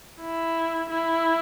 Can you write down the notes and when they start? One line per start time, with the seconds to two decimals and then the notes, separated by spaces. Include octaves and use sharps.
0.21 E4
0.90 E4